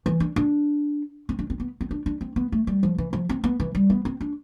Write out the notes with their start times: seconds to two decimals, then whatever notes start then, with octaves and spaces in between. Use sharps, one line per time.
0.06 E3
0.20 D4
0.36 D4
1.29 C4
1.39 D4
1.50 C4
1.60 B3
1.81 C4
1.91 D4
2.06 D4
2.21 C4
2.36 B3
2.52 A3
2.67 G3
2.83 F3
2.98 E3
3.13 F3
3.29 C4
3.44 B3
3.60 E3
3.75 G3
3.90 B3
4.05 C4
4.21 D4